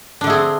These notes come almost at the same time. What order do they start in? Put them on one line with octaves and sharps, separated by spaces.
D4 D3 A3 G#4 C4